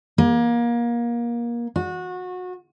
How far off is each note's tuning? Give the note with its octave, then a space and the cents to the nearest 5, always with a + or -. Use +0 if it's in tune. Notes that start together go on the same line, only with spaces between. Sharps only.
A#3 +25
F#4 -25